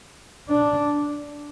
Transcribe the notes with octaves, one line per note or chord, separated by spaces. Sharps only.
D4